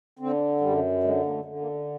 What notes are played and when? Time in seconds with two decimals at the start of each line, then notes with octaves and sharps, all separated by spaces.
0.19 D3 C4
0.61 F#2 G3
1.03 D3 G#3
1.26 A#3
1.31 A3
1.45 D3
1.59 A#3